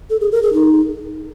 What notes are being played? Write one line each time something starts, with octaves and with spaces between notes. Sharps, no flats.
A4
G#4
A#4
G#4
D#4